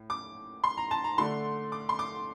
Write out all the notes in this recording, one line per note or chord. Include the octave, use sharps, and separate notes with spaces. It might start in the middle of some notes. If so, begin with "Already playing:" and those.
Already playing: A2
D6
C6
A#5
A5
A#5
D3 A3 D4 C6
D6
C6
D6